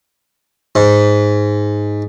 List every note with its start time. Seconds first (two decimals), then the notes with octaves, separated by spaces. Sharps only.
0.75 G#2